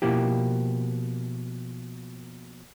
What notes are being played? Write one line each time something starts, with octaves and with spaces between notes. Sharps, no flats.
B2 F3 A#3 E4 G4